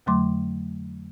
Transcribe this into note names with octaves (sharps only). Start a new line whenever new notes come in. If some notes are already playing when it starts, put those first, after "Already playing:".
F2 D3 F#3 A3 C6 D6